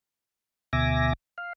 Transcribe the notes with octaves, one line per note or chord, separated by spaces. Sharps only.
D2 B2 E5 G#5 D6 A#6
F5